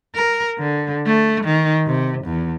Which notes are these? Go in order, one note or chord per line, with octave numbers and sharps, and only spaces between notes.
A#4
D3
A3
D#3
C3
E2